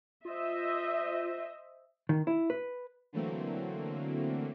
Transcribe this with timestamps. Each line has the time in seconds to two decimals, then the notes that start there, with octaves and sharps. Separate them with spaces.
0.25 F4 C5 D#5 E5
2.09 D#3
2.27 E4
2.50 B4
3.13 D3 E3 F#3 A3 A#3 C4